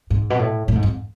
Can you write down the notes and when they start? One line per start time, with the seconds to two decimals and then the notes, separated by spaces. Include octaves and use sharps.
0.10 G#2
0.30 B2
0.39 A2
0.68 A2
0.75 G#2
0.83 F2